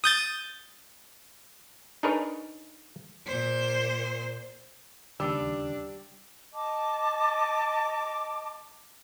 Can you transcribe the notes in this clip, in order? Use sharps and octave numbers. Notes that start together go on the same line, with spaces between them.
D#6 G6 A6
D4 D#4 G#4 A#4 B4 C#5
A#2 C5
D#2 C#3 G3 D4 E6
D#5 A5 D6